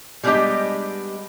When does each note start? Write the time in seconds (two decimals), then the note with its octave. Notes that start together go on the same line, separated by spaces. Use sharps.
0.23 G3 G#3 B3 D4 G4 D#5